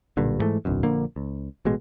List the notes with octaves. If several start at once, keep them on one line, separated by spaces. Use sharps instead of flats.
B1 G2 A#2 D3
G#2 E3 A3
D1 B1 F#2
A#1 D3 A#3
C#2
A1 B2 G#3